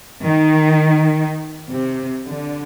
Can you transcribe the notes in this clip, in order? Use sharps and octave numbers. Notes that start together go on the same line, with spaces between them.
D#3
C3
D3